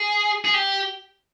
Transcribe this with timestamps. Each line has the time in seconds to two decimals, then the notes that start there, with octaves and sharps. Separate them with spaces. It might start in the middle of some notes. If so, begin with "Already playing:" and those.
Already playing: G#4
0.45 G#4
0.54 G4